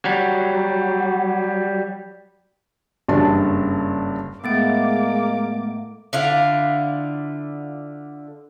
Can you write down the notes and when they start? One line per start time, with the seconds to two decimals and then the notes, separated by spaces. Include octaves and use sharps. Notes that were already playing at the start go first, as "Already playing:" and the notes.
0.05 F#3 G3
3.08 F#1 G2 C#4 D4 A5
4.44 A2 G#3 A#3 B3 F#5 D6 A6 D7
6.13 D3 E4 F4